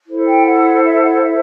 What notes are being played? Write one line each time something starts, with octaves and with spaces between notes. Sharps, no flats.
E4 A4 C5
G5
F#5
E5
F#5
E5